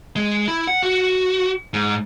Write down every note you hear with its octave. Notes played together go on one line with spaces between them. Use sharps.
G#3
E4
F#5
F#4
G#2